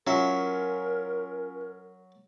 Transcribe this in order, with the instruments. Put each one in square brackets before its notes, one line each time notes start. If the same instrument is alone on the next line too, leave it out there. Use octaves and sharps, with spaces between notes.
[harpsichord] F#3 E5 [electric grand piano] C#4 F4 [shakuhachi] A#4